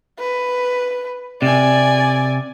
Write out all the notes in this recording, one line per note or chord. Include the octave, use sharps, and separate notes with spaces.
B4
C3 D5 G#5